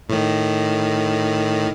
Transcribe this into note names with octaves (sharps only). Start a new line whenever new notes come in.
A2 D#3